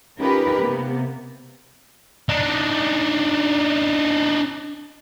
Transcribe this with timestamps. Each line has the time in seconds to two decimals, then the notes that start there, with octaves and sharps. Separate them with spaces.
0.18 C#4 D#4 F4 G4 A#4 B4
0.61 C3 A#3 B3
2.29 D4 D#4